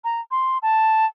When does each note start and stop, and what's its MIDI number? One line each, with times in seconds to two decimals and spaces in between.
0.04 0.21 82
0.31 0.58 84
0.62 1.06 81